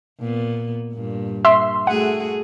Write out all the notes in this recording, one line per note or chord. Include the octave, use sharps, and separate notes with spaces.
A#2 B3
G2 A#2
E5 C6
A3 F#4 G#4 F#5